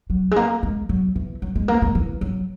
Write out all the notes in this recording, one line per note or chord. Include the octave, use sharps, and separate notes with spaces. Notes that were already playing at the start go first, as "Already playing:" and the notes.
F#3
G#3
A#3
G#3
F#3
E3
F#3
G#3
A#3
G#3
E3
F#3